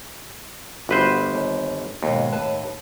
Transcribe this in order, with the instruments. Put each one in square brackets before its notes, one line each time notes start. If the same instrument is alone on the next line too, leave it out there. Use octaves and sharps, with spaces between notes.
[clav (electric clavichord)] G1 B4 C5 [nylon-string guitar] G3 F#4
[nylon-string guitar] G3
D#2
[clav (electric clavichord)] D#2 [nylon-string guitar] G#2 B2 A#3
[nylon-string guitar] A2 B4 A5